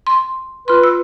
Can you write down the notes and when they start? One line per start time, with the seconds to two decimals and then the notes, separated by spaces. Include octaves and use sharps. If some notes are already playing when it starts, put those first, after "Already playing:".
0.07 C6
0.68 F4 B4 C6
0.83 E6